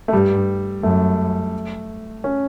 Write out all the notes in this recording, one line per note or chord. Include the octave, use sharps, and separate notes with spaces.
A3
G2 G3
F#2 A3
C#4